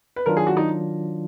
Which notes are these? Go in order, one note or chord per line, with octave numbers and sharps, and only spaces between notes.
B4
D#3 F#3 D4 F4 A#4
G#4
F#4
D#4